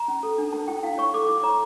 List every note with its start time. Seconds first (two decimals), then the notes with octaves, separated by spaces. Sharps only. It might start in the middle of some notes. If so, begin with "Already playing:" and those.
Already playing: A#5
0.08 C#4
0.23 A4
0.38 D4
0.53 A#4 A5
0.68 E4 G5
0.83 E4 F5
0.98 C#5 C#6
1.14 A4 D6
1.29 E4 D6
1.43 C#5 A#5